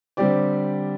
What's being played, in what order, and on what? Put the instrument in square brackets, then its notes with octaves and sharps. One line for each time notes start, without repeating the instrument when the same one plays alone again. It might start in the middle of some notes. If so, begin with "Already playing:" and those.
[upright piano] D3 G3 C4 G4 D5